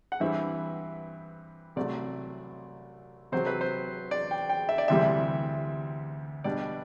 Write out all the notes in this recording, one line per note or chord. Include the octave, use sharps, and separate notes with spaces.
F#5
G2 E3 G3 C4 E4 E5
C2 C3 F#3 A3 D5
C3 F#3 C4 C5
B4
C5
D5
G5
G5
E5
D5
D2 C3 E3 G3 E5
B2 G3 D4 D5